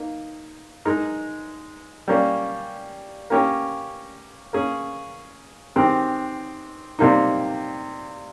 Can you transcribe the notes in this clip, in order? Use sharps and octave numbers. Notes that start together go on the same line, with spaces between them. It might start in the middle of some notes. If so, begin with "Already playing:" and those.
Already playing: A#3 D#4
G#3 D#4 A#4
G3 A#3 C#4
A#3 C#4 G4 A#4
A#3 C#4 G#4
D#3 G#3 C4 G4 A#4
C3 G3 A#3 D#4